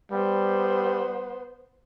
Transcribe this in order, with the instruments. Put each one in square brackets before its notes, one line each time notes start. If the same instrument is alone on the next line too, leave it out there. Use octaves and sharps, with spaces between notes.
[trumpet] G3 [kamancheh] B3 C5